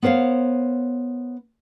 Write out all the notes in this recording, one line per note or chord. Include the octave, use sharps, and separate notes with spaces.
B3 A#4 C5 C#5 F5